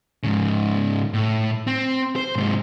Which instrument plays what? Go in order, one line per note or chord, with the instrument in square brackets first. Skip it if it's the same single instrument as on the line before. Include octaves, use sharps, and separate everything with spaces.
[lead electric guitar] G#2 C#3
A2
C4
C5
G#2 C3